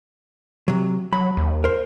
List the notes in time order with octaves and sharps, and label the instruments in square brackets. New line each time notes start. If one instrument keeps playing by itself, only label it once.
[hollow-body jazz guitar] C3 F#3
[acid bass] F#3 [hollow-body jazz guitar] B5
[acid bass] D#2
[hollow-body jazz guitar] A#4 C5